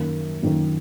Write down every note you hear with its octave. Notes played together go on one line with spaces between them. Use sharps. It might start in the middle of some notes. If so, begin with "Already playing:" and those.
Already playing: F#2 D#3 A#3
F#2 D#3 A#3